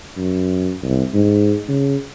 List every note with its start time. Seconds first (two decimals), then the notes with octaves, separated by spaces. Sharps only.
0.17 F#2
0.83 C2
1.14 G#2
1.69 C#3